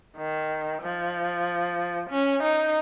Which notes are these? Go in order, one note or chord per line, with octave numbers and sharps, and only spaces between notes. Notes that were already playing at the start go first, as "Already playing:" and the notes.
D#3
F3
C#4
D#4